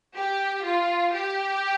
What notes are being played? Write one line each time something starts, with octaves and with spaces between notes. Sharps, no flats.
G4
F4
G4